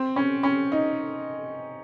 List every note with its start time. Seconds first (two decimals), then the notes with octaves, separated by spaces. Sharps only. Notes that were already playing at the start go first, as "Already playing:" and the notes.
Already playing: C4
0.16 C#4
0.43 C#4
0.72 D#4